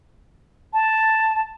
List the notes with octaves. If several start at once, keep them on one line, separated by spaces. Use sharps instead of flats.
A5